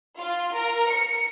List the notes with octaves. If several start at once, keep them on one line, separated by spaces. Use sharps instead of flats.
F4
A#4
C#7